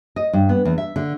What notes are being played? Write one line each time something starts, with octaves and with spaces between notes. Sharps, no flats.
D#5
G2
B3
E2
E5
D3